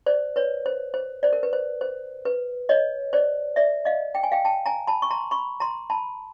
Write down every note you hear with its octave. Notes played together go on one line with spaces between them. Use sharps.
C5 D5
B4 C#5
C5
C5
C5 D5
A#4
B4
C5
C5
B4
C#5 D#5
C5 D5
D5 E5
D#5 F5
G5
G#5
F5 G5
G5 A5
G#5 A#5
A5 B5
C#6
A#5 C6
B5 C#6
A#5 C6
A5 B5